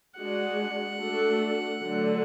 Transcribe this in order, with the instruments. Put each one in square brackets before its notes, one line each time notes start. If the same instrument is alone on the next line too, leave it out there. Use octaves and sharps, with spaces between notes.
[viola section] G#3 D4 F#4 [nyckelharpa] F#5
[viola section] A3 D4 F#4 A4
D3 F#3 A3 D4